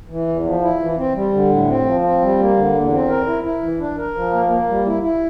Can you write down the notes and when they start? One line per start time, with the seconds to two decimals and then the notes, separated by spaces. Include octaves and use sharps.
0.09 E3
0.28 E2
0.45 F3
0.63 E4
0.80 E3
0.97 C4
1.15 G3
1.33 D3
1.50 A2
1.68 C4
1.86 F3
2.04 C4
2.22 G3
2.39 A#3
2.57 D3
2.74 E2
2.92 C4
3.09 A#4
3.26 E4
3.44 E4
3.62 E3
3.79 D4
3.98 A#4
4.15 F3
4.33 A#3
4.50 A#3
4.69 G3
4.86 E4
5.03 E4